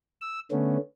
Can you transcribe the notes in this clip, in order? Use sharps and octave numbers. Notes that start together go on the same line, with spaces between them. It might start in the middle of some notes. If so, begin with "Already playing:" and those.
E6
D3 A3 B3 C#4